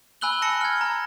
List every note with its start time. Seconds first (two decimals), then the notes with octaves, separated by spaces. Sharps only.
0.21 G#5 B5 E6 F#6 F#7 G7
0.42 A5 E6 A#6 C#7
0.61 F6 G#6
0.81 A#5